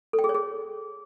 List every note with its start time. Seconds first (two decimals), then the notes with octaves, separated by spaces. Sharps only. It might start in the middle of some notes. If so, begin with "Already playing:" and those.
0.13 A4
0.19 G5
0.24 G#4
0.29 C#5
0.34 G#4